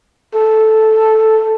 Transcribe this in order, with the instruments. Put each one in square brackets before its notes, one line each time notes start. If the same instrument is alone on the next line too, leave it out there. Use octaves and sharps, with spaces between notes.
[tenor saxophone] A4